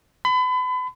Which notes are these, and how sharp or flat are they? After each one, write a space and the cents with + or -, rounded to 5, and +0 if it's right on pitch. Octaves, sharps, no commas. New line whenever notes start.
B5 +35